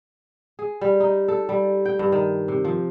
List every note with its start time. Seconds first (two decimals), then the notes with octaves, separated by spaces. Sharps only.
0.59 G#4
0.81 G3
1.00 D#4
1.28 A4
1.49 G3
1.85 G5
1.99 G2
2.12 D#3
2.48 C3
2.65 F3